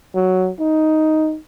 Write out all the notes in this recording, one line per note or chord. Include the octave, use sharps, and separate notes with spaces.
F#3
D#4